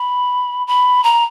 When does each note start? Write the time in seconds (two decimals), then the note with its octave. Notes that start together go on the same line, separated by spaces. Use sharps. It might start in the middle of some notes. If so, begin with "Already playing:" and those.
Already playing: B5
0.67 B5
1.04 A#5